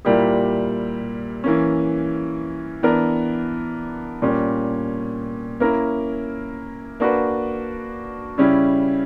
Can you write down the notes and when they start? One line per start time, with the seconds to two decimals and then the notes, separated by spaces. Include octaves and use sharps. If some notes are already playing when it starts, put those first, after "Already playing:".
0.05 A#2 G3 A#3 E4 G4
1.44 E3 A#3 C#4
2.83 E3 B3 D4 A#4
4.22 A#2 G3 C#4
5.60 A#3 C#4 E4 A#4
7.00 A#3 D4 F#4 B4
8.38 C#3 G3 C#4 E4